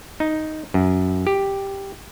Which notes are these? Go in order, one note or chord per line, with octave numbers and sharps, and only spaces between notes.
D#4
F#2
G4